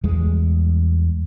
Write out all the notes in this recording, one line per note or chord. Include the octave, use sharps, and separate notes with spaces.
E2 G3 G#3